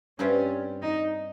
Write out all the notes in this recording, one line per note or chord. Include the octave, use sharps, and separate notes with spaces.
G2 G3 C4 C#4 F4 C5
D#4